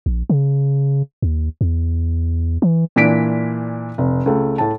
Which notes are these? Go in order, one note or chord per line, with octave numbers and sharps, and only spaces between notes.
A#1
C#3
D#2
E2
E3
A#2 E3 D4 B6 D7
F1
C#2 A3
A2 A5